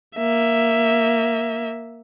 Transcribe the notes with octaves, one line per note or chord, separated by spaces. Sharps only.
A#3 E5